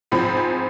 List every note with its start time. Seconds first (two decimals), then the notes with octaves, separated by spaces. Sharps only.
0.12 G#2 F3 C4 B5
0.37 G#5